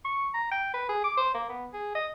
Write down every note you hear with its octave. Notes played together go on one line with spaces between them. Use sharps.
C#6
A#5
G5
B4
G#4
D6
C5
A#3
B3
G#4
D#5